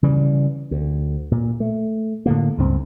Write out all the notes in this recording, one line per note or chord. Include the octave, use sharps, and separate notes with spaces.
C#3 E3 G3
D2
A#2
A3
A2 D3 A#3
C#2 G2 C4